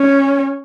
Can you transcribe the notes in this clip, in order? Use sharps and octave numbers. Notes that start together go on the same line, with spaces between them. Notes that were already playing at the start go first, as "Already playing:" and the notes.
Already playing: C#4